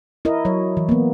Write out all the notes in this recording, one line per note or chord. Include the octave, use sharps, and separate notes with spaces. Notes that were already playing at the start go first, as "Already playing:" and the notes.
E4 A#4 D#5
F#3 C#5
E3
A#3 B3